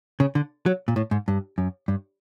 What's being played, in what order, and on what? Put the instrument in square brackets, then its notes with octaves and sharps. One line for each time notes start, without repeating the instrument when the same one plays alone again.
[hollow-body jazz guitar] C#3
D3
F#3
A#2
A2
G#2
G2
F#2
G2